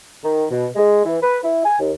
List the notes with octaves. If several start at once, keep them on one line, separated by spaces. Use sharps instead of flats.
D#3
B2
G#3
E3
B4
E4
G#5
D#2